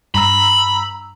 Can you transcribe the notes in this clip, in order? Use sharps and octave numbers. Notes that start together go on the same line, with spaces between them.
G2 A#5 B5 E6